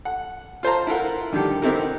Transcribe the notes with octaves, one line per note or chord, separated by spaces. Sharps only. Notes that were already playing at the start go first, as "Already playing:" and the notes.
F#5
F4 C5 A5 A#5
E4 F4 A#4 F#5
D3 D#3 G3 G4 A4
B3 C4 D#4 E4 G4 A#4